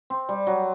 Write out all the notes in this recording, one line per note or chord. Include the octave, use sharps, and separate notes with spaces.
C4
G3
F#3